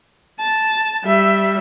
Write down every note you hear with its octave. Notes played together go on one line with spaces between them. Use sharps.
A5
G3 E5